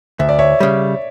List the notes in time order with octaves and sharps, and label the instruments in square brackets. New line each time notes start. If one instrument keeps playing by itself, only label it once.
[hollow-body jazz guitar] D2 [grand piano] E5
[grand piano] D5
C#5 E5
[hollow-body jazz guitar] C#3 G3